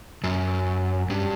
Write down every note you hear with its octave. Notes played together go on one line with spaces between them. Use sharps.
F#2
G2